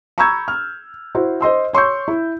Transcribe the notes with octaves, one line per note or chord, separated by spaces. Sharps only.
A#5 B5 C#6 E6 G6 G#6
F6
E4 F#4 C5
C5 D#5 C6 E6
C#5 C6 C#6 E6 G6
E4